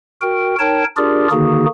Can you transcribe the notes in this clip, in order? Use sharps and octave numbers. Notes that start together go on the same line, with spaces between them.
F#4 A#4 G5
D#4 A#4 C#5 G5 A5
D4 F4 G4 G#4 A#4 D5
D3 D#3 A#3 D#4 F#4 G#4